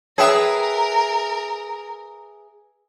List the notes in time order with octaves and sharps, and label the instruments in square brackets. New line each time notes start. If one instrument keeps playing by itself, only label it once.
[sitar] G#4 B4 E5 [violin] A#4 [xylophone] C#5 G5 D#6